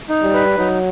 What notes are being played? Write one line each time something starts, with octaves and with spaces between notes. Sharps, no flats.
D#4
G3
B4
F#3 D#4